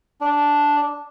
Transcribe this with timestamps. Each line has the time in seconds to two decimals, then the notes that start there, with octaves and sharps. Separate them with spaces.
0.21 D4